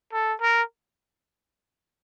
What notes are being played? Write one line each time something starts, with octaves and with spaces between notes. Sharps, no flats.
A4
A#4